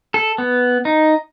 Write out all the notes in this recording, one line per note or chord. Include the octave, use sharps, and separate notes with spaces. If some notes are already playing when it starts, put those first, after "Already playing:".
A4
B3
D#4